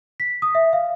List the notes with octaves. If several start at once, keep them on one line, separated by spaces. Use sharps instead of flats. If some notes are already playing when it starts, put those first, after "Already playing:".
B6
D#6
E5
F5